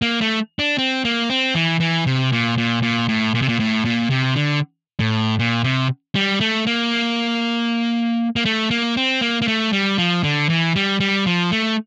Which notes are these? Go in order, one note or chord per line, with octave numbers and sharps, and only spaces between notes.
A#3
A3
D4
C4
A#3
C4
E3
E3
C3
A#2
A#2
A#2
A2
A#2
C3
A#2
A2
A#2
C3
D3
A2
A#2
C3
G3
A3
A#3
A#3
A3
A#3
C4
A#3
A#3
A3
G3
F3
D3
E3
G3
G3
F3
A3